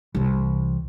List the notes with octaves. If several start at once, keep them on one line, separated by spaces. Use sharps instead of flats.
C2 E3